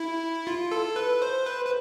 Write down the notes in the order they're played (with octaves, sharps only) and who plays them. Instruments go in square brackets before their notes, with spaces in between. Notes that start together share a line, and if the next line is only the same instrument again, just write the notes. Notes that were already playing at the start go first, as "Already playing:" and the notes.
Already playing: [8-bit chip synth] E4
F4
A4
B4
C5
B4
B4